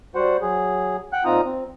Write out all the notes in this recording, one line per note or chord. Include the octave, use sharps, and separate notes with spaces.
G3 F#4 C5 F#5
F#3 G#4
F#5 G5 F#6
A#2 C4 D#4 F4 A#5 D#6
C4